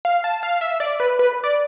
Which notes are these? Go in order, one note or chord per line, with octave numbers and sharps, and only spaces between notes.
F5
A5
F5
E5
D5
B4
B4
D5